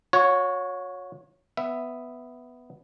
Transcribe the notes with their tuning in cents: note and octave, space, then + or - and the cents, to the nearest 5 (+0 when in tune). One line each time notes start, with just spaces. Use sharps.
F#4 -40 C#5 +0
B3 +5 E5 +5